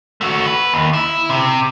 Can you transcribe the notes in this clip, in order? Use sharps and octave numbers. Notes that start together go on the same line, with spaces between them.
A3 F#4
B4
D#2
E4
C3